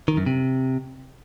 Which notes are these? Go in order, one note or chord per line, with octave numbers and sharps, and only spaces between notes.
D#3
F#2
C3